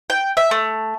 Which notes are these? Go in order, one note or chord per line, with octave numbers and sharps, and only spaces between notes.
G5
E5
A3